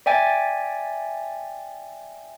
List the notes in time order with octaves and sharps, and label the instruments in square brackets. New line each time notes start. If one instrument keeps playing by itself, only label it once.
[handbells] D5 E5 G5 G#5 A6